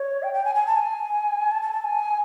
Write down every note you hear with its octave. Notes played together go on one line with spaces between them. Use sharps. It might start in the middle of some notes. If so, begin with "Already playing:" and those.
Already playing: C#5
G5
G5
G#5
G#5
A5
G#5
A5
A5
A5
G#5